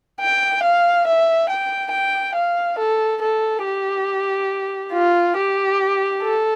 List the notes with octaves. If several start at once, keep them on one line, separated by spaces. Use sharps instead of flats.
G5
F5
E5
G5
G5
F5
A4
A4
G4
F4
G4
A4